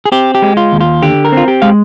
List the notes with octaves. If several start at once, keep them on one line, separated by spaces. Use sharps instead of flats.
G#4
C4 G4
G4
G#3
F4
D#2
F4
D3 G4
A#4
C4 F4
G4
G#3 F5